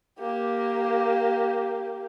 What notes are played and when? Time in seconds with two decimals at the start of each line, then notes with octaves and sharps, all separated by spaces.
0.20 A#3 G4